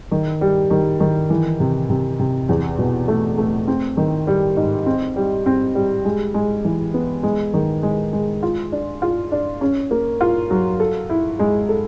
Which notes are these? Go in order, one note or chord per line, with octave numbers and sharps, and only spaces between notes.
D#3
G3
D#3
D#3
E3
C3
C3
C3
E2
B2
A3
A3
C4
D#3
G3
G#2
C4
G3
C4
G3
G#3
G#3
E3
B3
G#3
D#3
G#3
G#3
F4
D4
F4
D4
C#4
A#3
F4
F#3
A4
E4
G#3
A4